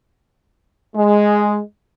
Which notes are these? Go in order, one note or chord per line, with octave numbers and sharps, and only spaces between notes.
G#3